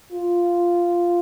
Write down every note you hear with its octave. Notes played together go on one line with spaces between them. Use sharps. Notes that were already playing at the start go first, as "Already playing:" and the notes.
F4